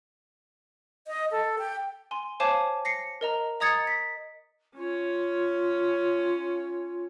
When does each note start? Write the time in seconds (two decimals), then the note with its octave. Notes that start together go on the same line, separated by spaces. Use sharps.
1.07 D#5
1.31 A4
1.58 G5
2.11 G#5 C6
2.40 C5 C#5 F5 G#5 A5 D6
2.85 A#6 C7 C#7
3.21 A#4 D#5 A#5
3.60 D#5 A#5 D#6 G#6 A6 C#7
3.87 B6
4.76 C#4 F4 C#5